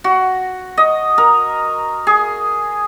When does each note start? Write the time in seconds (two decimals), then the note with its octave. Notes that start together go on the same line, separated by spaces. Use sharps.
0.04 F#4
0.77 D#5
1.18 A#4
2.07 G#4